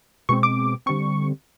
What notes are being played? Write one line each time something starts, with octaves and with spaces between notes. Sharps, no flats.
B2 G#3 C4 C#6
D6
D3 G3 C4 C#6